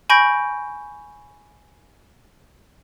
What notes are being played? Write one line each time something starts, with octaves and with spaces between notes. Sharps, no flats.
G#5 B5 C#6 G6 A#6 D7